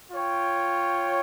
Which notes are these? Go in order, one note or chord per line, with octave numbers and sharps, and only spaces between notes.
F4 C#5 G5